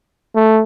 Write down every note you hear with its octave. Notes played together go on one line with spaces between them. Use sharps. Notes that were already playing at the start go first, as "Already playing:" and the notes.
A3